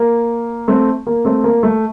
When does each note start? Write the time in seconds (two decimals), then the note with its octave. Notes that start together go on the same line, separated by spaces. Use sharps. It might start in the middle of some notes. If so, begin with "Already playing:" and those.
Already playing: A#3
0.68 A3 C4
1.06 A#3
1.25 A3 C4
1.44 A#3
1.63 A3